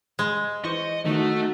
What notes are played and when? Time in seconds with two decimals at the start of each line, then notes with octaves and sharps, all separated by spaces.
0.19 G#3
0.64 E3 C5 D#5 C#6
1.05 D#3 A3 D#4 F#4